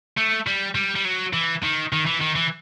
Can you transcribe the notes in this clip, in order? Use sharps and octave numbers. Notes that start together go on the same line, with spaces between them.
A3
G3
G3
G3
F#3
E3
D#3
D#3
E3
D#3
E3